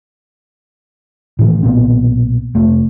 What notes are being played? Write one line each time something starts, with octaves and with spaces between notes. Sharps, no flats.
A2 D#3 E3
B1 A#2 B3 C4
F1 A3